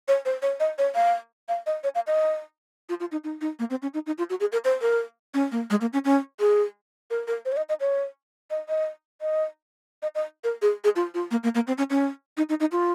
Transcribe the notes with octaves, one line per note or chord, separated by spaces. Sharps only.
C#5
C5
C#5
D#5
C#5
F5
F5
D#5
C#5
F5
D#5
F4
F4
D#4
D#4
D#4
A#3
C4
C#4
D#4
D#4
F4
F#4
G#4
A#4
C5
A#4
C#4
A#3
G#3
A#3
C#4
C#4
G#4
A#4
A#4
C5
C#5
D#5
D#5
C#5
D#5
D#5
D#5
D#5
D#5
A#4
G#4
G#4
F4
F4
A#3
A#3
A#3
C4
C#4
C#4
D#4
D#4
D#4
F4